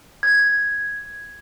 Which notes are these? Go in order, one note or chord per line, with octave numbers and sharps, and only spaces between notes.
G#6